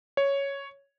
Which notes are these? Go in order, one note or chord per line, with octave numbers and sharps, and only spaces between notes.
C#5